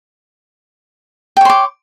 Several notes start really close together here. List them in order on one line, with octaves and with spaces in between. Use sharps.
G5 C#5 C6 D6